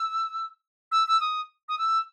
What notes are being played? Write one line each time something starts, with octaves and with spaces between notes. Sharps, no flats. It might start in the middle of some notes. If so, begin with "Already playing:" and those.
Already playing: E6
E6
E6
D#6
D#6
E6